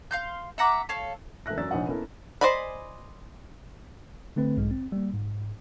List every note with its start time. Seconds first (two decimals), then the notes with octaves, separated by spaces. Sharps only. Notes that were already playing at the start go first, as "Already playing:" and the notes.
0.11 F5 C6 G6
0.58 E5 F#5 A#5 D6
0.89 A4 C#5 F5
1.46 E1 A4 A#4 E5 F#6 A#6
1.58 F#2 F#3 D5 E6 A6
1.71 F1 A#1 D#4 C#5 D#5 F#5
1.87 A#3 B3 C#4 E4 A4 A#4
2.41 C5 D5 D#5 G#5 B5
4.36 D3 A3 C4 B4
4.58 B1 G#2 G#3
4.71 C4
4.92 G3 A#3
5.14 G#2